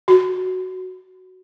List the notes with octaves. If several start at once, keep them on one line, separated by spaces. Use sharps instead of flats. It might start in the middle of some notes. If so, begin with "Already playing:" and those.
F#4